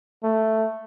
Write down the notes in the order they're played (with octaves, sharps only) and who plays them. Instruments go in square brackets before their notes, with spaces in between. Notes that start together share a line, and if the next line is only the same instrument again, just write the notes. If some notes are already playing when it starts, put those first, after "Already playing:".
[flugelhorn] A3